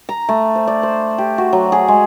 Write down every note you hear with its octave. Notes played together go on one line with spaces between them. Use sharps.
A#5
A3
C5
D5
C5
G4
F#4
F#3
G#4
G#3